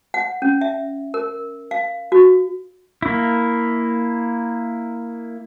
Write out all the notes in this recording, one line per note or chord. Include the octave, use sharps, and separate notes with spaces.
F#5
C#4
E5
A#4
F5
F#4
A#3 E4